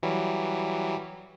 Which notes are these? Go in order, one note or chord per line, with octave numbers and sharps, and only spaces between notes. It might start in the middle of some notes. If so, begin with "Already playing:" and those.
E3 F#3 G3